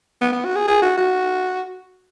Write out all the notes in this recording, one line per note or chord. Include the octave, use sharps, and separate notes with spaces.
B3
B3
F#4
G#4
G#4
F#4
F#4